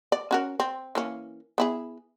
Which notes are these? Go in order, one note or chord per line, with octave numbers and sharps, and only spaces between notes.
D5
C#4 F#4 A#4
C4
E3 A#3 C#4
B3 E4 G#4